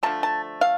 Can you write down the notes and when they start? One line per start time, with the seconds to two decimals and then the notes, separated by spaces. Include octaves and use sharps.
0.03 D3 F3 A3 A5
0.23 A5
0.61 F5